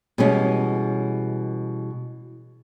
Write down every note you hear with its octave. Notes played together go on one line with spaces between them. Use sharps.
B2 E3 G3 G#3 C#4